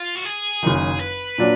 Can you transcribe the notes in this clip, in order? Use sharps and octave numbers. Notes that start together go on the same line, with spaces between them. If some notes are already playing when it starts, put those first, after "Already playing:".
Already playing: F4
F#4
G#4
F#1 F#2 D#3
B4
A#2 F#3 D4